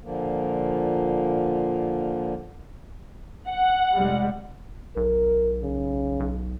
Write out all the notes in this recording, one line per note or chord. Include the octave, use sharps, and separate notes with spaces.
A#2 D3 F3 A#3
F#5
F1 G3 G#3
B1 A#4
C#3
B1